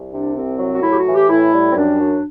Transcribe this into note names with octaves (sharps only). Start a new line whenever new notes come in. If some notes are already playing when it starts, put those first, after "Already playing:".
Already playing: C2
C3 D4
C2 C4
F#3
F#4
A2 E4
G4
F#4
E3
G4
A2 E4
G3
C4
F#2 D4
F#3